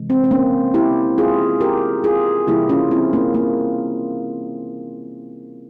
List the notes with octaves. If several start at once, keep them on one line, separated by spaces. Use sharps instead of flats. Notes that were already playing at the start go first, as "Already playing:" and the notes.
Already playing: C3 E3 G#3
C4
C4
A#3 C#4
E4 G4
F4 G#4
G4 A#4
F4 G#4
C3 E3 G3 A#3 E4 G4
C#4 F4
C4 E4
A#3 C#4
A#3